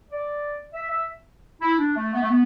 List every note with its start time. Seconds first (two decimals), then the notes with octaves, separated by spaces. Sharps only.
0.11 D5
0.73 E5
0.89 E5
1.60 E4
1.78 D4
1.96 A3
2.14 B3
2.22 A3
2.29 B3